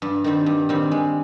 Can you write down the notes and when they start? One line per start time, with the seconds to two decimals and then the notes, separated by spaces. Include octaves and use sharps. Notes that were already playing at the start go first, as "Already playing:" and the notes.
0.02 G2
0.24 D#3 G3 C4
0.46 G2
0.69 D#3 G3 C4
0.91 G#3